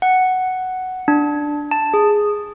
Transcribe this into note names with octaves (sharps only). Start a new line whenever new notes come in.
F#5
D4
A5
G#4